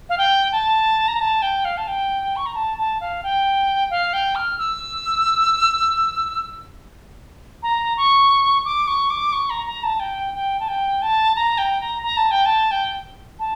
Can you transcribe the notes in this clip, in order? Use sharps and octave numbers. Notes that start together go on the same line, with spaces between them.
F5
G5
A5
A#5
A5
G5
F5
A5
G5
C#6
A#5
A5
A5
F5
G5
F5
G5
F6
E6
A#5
C#6
D6
C#6
D6
C#6
A#5
A#5
A5
G5
G5
A5
G5
A5
A#5
G5
A#5
A#5
A5
G5
A5
G5
A5